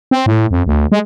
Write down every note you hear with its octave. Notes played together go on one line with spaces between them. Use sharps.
C4
A2
F2
D2
G#3